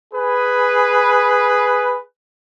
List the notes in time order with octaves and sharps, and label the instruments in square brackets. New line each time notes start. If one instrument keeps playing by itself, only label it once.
[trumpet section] G#4 B4